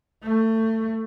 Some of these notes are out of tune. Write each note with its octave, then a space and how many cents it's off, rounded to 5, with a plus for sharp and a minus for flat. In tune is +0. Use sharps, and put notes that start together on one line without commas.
A3 +25